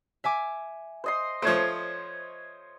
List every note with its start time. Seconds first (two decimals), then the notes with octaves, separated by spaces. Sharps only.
0.24 E5 G#5 D6
1.04 C5 D#5 C6
1.42 F3 A3 C5 C#5